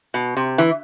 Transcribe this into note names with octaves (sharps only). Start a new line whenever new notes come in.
B2
C3
E3